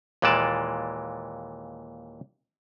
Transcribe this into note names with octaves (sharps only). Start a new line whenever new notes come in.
D#2 A#2 E3 G#3 D5 A5